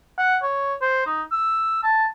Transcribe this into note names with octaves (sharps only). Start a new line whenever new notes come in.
F#5
C#5
C5
D#4
E6
A5